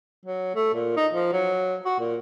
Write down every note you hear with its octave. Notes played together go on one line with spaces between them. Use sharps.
F#3
A3
A#2
D#4
F3
F#3
F#4
A#2